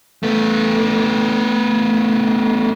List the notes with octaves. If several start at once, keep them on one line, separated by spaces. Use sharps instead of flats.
A3 B3